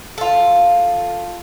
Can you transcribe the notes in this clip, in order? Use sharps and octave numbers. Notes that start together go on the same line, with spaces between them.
F4 A4